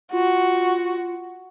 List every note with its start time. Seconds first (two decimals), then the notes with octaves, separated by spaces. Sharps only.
0.13 F4 F#4